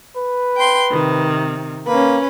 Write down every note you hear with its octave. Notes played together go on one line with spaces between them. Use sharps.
B4
G5 C6
C3 D#3
A#3 C#4 B4